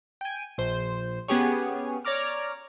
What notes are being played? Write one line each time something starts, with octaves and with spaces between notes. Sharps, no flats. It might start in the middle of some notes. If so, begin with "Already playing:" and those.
G5 G#5
A#1 C5
B3 C#4 G4 G#4 C#5
C#5 D5 A#5 D6 F6